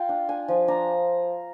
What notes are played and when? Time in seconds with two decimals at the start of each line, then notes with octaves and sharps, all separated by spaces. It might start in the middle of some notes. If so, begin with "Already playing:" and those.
Already playing: F4 F5 G5
0.09 D4
0.29 D4 G#5
0.48 F3
0.68 D4 A#5